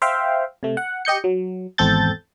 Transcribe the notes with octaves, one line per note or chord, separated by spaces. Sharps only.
C5 E5 F5 G5
C3 A3
F#5
G4 D#5 G6 C#7
F#3
G#1 E2 C4 A4 G6 A6